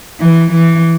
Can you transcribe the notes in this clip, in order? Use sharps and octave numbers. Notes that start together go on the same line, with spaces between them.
E3
E3